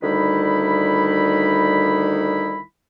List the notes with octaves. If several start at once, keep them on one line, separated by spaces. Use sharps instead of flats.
D2 D#3 G3 D#4 E4 B5